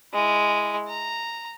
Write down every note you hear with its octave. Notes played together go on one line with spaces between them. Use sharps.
G#3 E4
A#5